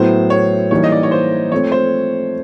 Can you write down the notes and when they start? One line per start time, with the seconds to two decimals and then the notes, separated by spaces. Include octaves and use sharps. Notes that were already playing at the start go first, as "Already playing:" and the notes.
Already playing: A2 F#3 B3 E4 C5
0.30 C#5
0.71 E3 G3 A#3 D#4 C#5
0.84 D#5
0.92 D5
1.03 C#5
1.11 C5
1.52 F3 A3 C4 C#5
1.72 C5